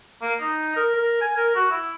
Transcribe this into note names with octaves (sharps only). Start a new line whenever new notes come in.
A#3
D#4
A#4
A#4
G#5
A#4
F#4
E4